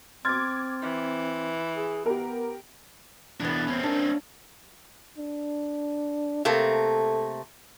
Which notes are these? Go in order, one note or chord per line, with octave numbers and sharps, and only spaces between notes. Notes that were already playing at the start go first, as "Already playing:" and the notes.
C4 C6 D6 F6 G#6 A6
E3
G#4
B3 G4 A#4
E2 E3 B3 D4
C4 C#4
A#3 D4
D4
C3 A3 A#3 A4